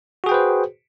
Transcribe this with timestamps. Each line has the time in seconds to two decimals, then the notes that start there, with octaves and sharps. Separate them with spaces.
0.24 F#4
0.26 G#4
0.29 G5
0.32 B4
0.34 C5